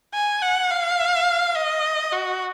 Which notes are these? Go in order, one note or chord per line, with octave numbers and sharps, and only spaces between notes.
G#5
F#5
F5
D#5
F#4